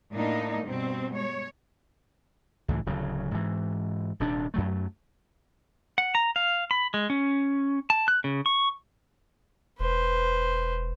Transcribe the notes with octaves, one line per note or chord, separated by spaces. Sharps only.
A2 A#3 D4 D#4
G2 B2 C4
G#3 C#5
C#2 A2 E3
D1 C#3 F#3
G#2 E3
D#1 D#2 C3 D4
F#2 F#3 A3
F#5
A#5
F5
B5
G#3
C#4
A5
F#6
C#3
C#6
E1 B4 C5